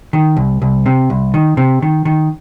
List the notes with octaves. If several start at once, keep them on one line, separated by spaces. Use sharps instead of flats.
D#3
C2
C2
C3
C2
D#3
C3
D#3
D#3